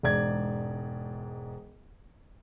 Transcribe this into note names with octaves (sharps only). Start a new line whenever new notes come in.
E1 G#2 D5 G#6